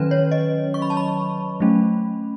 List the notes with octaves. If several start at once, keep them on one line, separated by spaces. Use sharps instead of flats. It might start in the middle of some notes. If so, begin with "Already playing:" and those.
Already playing: D#3 F#3 C#4 B4
C#5
D#5
C#6
B5
A5
B5
F#3 A3 C#4